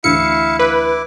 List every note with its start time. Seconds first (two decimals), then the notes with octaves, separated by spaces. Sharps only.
0.04 D2 E3 E4 E5 F5 C#7
0.59 E4 B4 D6